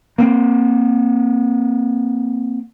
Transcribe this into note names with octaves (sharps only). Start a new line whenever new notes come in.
A#3 C4